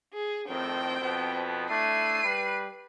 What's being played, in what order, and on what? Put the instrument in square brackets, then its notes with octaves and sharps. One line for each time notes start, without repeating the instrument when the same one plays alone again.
[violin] G#4
[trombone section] F2 A2 D#3 [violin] C4 G5
[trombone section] F2 B2 B3
[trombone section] A3 D4 E4 [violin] C7 D#7
[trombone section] G3 B4